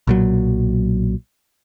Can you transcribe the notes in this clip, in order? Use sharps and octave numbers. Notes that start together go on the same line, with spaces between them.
B1 A#2 F#3